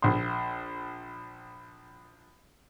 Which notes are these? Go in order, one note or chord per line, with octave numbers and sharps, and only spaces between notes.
A#1 C6